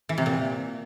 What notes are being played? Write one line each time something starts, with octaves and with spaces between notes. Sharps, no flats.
E3
C3
A#2